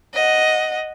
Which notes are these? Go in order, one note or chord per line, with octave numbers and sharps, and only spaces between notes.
D#5 F#5